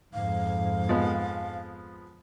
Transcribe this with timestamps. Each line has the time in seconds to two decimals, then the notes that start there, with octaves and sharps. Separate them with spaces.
0.14 F2 G#2 F5
0.89 F3 G#3 B3